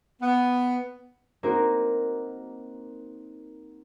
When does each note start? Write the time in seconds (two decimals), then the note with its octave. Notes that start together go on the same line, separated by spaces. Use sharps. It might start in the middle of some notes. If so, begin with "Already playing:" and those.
0.22 B3
1.43 A#3 C4 D#4 F#4 A#4